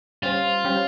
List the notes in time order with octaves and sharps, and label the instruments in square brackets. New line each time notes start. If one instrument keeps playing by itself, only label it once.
[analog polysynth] G3 C#4 G4 C5 [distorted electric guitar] F4
[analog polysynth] G3 C#4 G4 C5